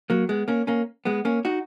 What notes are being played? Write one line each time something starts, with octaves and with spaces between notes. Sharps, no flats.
F#3 A#3
G#3 B3
A#3 C#4
A#3 C#4
G#3 B3
A#3 C#4
D#4 F#4